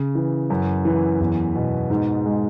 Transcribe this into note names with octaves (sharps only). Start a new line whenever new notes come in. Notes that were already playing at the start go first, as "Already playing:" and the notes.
Already playing: C#3
E3
F#2
E3
E2
B2
G#2
G#3